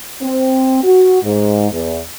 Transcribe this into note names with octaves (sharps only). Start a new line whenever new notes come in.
C4
F#4
G#2
E2